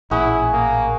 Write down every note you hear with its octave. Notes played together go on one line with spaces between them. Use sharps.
A1 A#2 E4 G#4 C#5 F#5
A#3